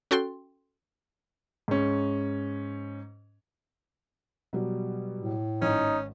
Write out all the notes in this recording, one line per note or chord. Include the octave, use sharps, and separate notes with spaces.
C#4 F#4 A4 G5 C6
G#2 C#4
B2 F#3 G3
A2
G#1 C#4 D#4